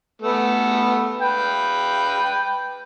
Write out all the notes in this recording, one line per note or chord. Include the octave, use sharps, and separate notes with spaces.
A3 B3
B4 G5